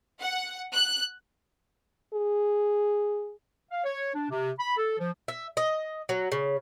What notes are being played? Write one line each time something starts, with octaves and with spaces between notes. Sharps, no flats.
F#5
F#6
G#4
F5
C#5
D4
C3
B5
A4
F3
E5
D#5
F#3
C#3